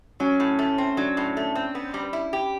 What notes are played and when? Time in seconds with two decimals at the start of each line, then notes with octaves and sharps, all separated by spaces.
0.20 F#3 C#4
0.40 A2
0.59 A3
0.78 C4
0.97 F#3 D4
1.17 A2
1.37 A3
1.55 C4
1.75 B3
1.94 G3
2.13 E4
2.33 G4